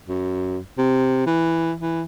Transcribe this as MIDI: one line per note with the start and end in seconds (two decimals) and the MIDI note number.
0.08 0.58 42
0.78 1.26 48
1.26 1.73 52
1.80 2.03 52